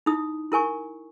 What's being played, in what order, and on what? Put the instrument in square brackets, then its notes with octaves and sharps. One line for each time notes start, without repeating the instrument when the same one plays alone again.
[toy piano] D#4 E4 D#6
E4 A#4 G#5 C#6